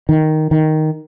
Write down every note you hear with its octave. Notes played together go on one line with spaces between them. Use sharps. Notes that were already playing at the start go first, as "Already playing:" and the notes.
D#3
D#3